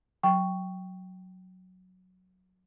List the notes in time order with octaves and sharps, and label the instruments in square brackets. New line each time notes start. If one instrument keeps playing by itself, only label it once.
[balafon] F#3 G5 C#6